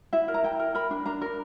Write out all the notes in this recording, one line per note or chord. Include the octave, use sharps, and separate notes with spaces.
E4 E5
A#4
A#5
E4 G5
A#4
A#4 B5
D4
D4 A#5
A#4